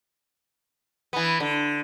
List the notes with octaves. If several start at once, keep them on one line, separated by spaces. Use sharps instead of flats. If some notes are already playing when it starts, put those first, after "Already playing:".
E3 B3
D3